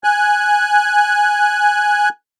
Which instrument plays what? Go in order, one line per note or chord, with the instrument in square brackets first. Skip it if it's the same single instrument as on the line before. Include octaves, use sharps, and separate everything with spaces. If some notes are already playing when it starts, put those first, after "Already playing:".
[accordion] G#5 F#6